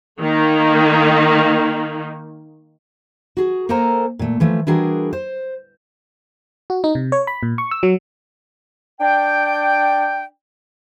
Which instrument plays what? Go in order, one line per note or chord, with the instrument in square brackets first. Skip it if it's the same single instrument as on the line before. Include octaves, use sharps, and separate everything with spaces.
[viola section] D#3 A#3
[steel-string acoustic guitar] F#4 G#4
A#3 A4 A#4 C5 G#5 A#5
A#2 A3
E3 F3 A3
E3 G3 D4 F#4 G#4 A#4
C5
[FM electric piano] F#4
D#4
C3
C#5
B5
A#2
C#6
E6
F#3
[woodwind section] D4 D5 G5